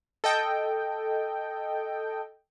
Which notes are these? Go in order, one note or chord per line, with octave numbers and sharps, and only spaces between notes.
A4 D#5 G5